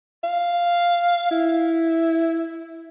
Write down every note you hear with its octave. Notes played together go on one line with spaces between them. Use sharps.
F5
E4